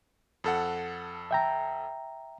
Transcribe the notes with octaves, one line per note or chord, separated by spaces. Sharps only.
F2 A4 F#5
E5 G5 A#5